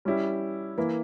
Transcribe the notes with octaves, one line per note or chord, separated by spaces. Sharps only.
G3 C#4 E4 G4
E3 A#3 E4